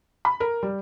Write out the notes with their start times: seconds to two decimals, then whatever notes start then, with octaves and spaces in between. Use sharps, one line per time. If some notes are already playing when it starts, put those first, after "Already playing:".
0.25 B5
0.40 A#4
0.63 G3